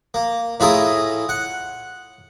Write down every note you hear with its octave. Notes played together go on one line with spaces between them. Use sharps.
A#3
A2 E4 F4 G#4 A#4 D#6
F#5